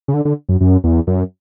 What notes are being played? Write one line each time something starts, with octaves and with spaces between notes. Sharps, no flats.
C#3
D3
D3
F#2
F#2
E2
F#2